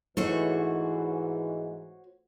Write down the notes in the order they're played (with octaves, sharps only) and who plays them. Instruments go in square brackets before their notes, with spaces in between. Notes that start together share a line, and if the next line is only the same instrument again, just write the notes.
[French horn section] G#2 E3 [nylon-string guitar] A3 [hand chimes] D#4 [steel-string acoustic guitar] F#4 C5 C#5